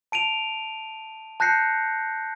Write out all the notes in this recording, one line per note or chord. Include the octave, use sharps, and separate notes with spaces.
A5 D7 D#7 F7
A5 F#6 G6 A#6 C7 C#7